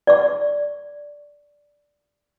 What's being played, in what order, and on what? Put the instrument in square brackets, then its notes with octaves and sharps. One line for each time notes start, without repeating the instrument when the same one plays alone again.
[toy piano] D5 C#6